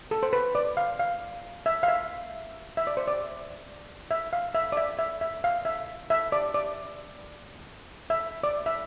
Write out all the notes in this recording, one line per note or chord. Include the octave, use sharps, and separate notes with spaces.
A4
C5
B4
D5
F5
F5
E5
F5
E5
E5
D5
C5
D5
E5
F5
E5
D5
E5
E5
E5
F5
E5
E5
D5
D5
E5
D5
E5